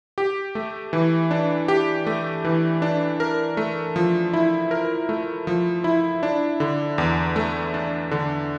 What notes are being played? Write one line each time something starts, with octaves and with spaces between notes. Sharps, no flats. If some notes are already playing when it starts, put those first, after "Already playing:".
G4
A3
E3
D4
G4
A3
E3
D4
A#4
A3
F3
E4
A#4
A3
F3
E4
D4
D3
E2
A3
D4
D3